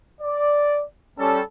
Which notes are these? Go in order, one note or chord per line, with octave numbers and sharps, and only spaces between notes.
D5
G3 C#4 A4